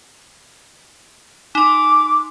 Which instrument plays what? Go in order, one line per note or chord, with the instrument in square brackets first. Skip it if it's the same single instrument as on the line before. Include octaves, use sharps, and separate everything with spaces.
[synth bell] D#4 C6 [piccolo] D6